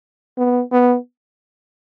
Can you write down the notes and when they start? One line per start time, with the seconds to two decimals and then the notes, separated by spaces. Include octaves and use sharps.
0.38 B3
0.72 B3